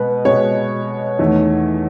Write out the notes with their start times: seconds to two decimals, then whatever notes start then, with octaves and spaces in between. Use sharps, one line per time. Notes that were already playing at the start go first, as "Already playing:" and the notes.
Already playing: B2 G#3 B4
0.25 B2 G#3 C#5
1.19 E2 D#3 A3